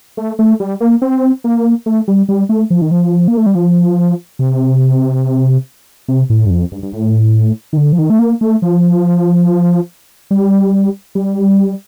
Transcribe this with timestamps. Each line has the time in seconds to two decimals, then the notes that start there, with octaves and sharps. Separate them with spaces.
0.17 A3
0.39 A3
0.60 G3
0.81 A#3
1.02 C4
1.44 A#3
1.86 A3
2.08 G3
2.29 G3
2.49 A3
2.70 F3
2.82 D#3
2.91 F3
3.28 A#3
3.37 A3
3.46 G3
3.55 F3
4.39 C3
6.08 C3
6.30 A2
6.46 G2
6.50 F2
6.72 G2
6.83 G2
6.93 A2
7.73 D#3
7.77 D3
7.93 F3
7.99 D#3
8.10 A3
8.19 A#3
8.41 A3
8.62 F3
10.31 G3
11.15 G3